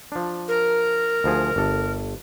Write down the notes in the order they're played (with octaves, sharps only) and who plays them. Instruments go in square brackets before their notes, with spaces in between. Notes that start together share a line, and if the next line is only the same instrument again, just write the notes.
[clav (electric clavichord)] F3 D4
[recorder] A#4
[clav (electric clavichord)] D2 F3 G#4
G1 A4